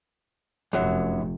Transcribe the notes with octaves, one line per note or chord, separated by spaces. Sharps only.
F1 F#2 F#3